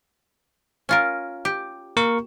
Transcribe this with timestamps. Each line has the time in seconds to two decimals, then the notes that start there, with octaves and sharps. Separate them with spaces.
0.89 C#4 F4 A#4
1.45 G4
1.97 A#3 A#4 C#6